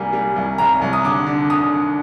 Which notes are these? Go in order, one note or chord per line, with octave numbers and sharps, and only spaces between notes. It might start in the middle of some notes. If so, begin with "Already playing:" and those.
Already playing: C2 G3 A#3 G#5
G3
C2
C2 A#5
C2
D#6
D3 D6
D3
D3 D#6
D3